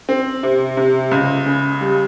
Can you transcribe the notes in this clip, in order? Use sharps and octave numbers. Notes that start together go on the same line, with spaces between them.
C4
C3
C3
C#2
C#3
G3